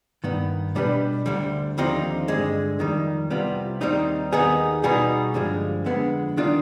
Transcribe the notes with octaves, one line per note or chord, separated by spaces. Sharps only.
G2 D#3 B3
B2 G3 D4 G4 B4
D2 D3 G3
D#2 D3 F3 C4 D#4
G2 D3 G#3
F2 D#3 G3
C2 C3 G3 B3 F4
D#2 D#3 G3 C4 D#4
D#2 D#3 B3 D#4 G#4
B2 G3 B3 D#4 G#4
G2 D3 F3 G#3
F2 D3 G#3 B3
D#3 G3 D4 F4